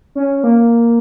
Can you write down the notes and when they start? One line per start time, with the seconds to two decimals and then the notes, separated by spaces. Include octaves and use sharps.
0.15 C#4
0.44 A#3